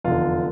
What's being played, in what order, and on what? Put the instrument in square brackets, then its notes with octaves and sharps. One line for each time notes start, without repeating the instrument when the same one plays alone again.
[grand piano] F1 E2 D3 F4